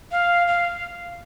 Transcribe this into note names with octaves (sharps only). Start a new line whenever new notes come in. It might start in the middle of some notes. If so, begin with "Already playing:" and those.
F5
F5